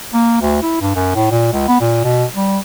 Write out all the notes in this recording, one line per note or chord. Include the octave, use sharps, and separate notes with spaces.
A#3
D2
E4
G2
F#2
A2
A#2
C#2
B3
A#2
B2
G3